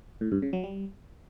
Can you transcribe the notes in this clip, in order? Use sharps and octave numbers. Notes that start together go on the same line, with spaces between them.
A2
G2
C#3
F#3
G3